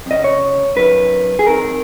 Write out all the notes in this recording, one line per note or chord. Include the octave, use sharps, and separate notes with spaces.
F2
C#3 D#5
C#5
F#2 D#3 B4
G#4
F2 D#3 A#4